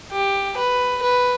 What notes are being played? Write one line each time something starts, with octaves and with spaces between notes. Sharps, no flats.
G4
B4
B4